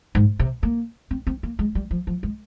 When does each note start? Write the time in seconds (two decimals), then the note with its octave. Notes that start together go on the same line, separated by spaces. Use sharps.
0.15 G#2
0.39 C3
0.63 A#3
1.11 C4
1.27 C4
1.43 A#3
1.59 G#3
1.75 G3
1.91 F3
2.07 F3
2.23 G#3